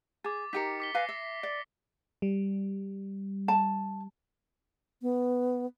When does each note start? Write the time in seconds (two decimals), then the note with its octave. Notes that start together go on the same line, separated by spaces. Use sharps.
0.24 G#4 D6 A6
0.53 D#4 G4 A#4 B6 C#7
0.80 D6 B6 G7
0.94 B4 F5 G#5 A#6 C7
1.09 E5
1.43 D5
2.22 G3
3.48 A5
5.02 B3